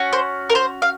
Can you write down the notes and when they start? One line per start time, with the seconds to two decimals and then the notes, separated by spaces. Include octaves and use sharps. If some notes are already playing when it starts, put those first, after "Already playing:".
Already playing: C#4 F#4
0.13 C5
0.50 A#4
0.55 C5
0.82 F5